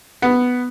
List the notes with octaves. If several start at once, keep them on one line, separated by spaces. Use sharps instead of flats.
B3